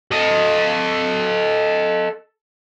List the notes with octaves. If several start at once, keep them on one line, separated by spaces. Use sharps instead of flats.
A4 D#5